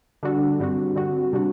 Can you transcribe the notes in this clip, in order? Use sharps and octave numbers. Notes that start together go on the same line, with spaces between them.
D3 G3 D4 F#4 A4
G2 D3 G3 C4 F#4
D3 G3 C4 F#4
C3 G3 D4 F#4